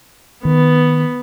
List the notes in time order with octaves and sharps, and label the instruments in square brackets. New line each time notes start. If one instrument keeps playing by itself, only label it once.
[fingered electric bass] D#3 [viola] B3